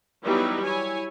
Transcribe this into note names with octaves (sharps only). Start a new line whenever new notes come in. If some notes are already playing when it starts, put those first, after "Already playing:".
E3 F#3 G3 B3 D#4 E4
E4 C#5 G#5